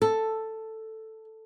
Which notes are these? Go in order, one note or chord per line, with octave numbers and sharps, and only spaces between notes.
A4